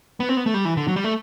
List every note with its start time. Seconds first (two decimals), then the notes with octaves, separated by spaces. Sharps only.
0.20 B3
0.29 C4
0.37 B3
0.46 A3
0.54 G3
0.65 E3
0.77 D3
0.88 F#3
0.96 G3
1.04 A3